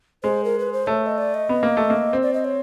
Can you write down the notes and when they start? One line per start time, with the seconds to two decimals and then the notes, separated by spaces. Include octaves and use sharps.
0.23 G#3 C5
0.45 A#4
0.59 B4
0.73 C5
0.87 A3 C#5
1.06 D#5
1.18 D5
1.34 D#5
1.49 B3
1.63 A#3
1.77 A3
1.90 A#3
2.13 C4
2.23 D5
2.34 D#5
2.45 C#5